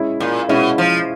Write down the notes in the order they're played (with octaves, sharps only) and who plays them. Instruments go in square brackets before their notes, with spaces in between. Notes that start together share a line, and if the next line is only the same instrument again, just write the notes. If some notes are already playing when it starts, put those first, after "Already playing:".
Already playing: [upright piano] G#3 C#4 E4
[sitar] A#2
[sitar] B2 [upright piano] G#3 C#4 E4
[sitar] F3